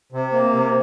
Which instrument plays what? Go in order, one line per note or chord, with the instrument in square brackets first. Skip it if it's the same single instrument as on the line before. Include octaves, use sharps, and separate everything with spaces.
[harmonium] C3
A#3
C3